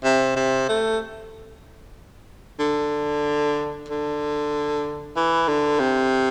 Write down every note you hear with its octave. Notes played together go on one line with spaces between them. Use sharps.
C3
C3
A3
D3
D3
E3
D3
C3